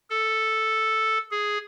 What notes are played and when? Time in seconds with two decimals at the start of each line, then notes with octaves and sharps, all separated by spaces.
0.10 A4
1.31 G#4